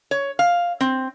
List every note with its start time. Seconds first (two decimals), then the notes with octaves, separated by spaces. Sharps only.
0.11 C#5
0.39 F5
0.81 C4